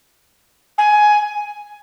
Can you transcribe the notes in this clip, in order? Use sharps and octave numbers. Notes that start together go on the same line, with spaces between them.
G#5